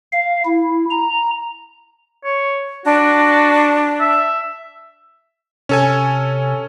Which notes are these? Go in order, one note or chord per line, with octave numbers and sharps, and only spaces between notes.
F5
E4
A#5
C#5
D4 F#4
E5
C3 C#4 A4 G#5